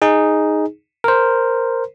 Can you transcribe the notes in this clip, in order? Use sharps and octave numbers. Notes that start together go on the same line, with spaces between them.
D#4 G#4
A#4 C5